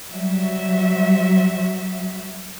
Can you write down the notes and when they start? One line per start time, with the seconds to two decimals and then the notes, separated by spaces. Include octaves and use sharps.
0.11 F#3 G3 F#4 E5